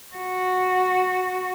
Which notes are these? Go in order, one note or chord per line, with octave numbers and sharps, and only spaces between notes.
F#4